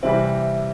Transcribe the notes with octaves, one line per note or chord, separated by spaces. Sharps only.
C3 E3 G3 C5 E5